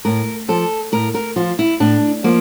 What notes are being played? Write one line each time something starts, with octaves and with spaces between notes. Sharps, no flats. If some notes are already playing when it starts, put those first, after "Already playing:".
A2 A#4
F3 A4
A2 A#4
A#4
F3 F4
E4
A2 D4
F3 A#3